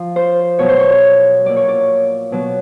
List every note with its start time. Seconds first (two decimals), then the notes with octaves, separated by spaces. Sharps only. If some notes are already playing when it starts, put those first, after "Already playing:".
Already playing: F3
0.16 C5
0.59 B2 F#3 C#5
0.69 C5
0.79 C#5
1.45 A#2 F#3 D5
1.56 C#5
1.68 D5
2.32 B2 F#3